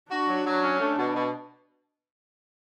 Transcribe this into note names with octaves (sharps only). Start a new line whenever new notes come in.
D4 F#4
F#3
F#3
C#4
A3 D4
B2
B2